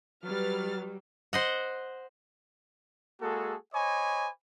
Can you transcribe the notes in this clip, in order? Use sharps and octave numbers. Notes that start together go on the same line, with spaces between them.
F#3 G3 B4 F6 A6
C5 D#5 F#5
G#3 A#3 F#4 G#4 A4
C5 C#5 D#5 G#5 B5 D6